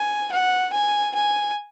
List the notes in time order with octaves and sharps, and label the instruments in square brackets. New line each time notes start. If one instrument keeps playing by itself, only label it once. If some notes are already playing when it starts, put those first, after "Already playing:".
Already playing: [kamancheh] G#5
F#5
G#5
G#5